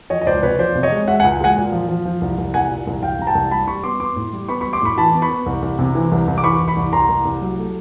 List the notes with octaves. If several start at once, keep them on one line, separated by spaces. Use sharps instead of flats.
F3 C#5 D#5
D#5
C#2 C5 D5
C3 B4 C#5
F3 C5 D5
C3
C#5 D#5
G#3
G#3 E5 F#5
F#5 G#5
C#2
G#3 F#5 G#5
A#2
F3
F3
F3
C2
C2
C2 F#5 G#5
A#2
C2
C2 F5 G5
C2 A#5
G5 A5
C2
G3 A5 B5
G3 B5 C#6
B3 C6 D6
B3 C6 D6
A2
G3
B3 B5 C#6
B5 C#6
G3
C6 D6
A2 B5 C#6
E3 A5 B5
B3
B5 C#6
B3
C2
C2
C3
E3
C2
C2
D6
E3 B5 C#6
C2
B5 C#6
C2
C2 A#5 C6
C2
C2
F#3
A3